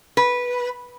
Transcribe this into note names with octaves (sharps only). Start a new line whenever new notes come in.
B4